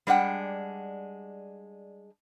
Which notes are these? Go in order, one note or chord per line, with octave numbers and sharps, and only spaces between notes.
G3 G#3 D4 F#5 G5